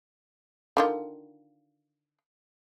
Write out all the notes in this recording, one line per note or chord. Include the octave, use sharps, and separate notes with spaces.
D3 D#3 F4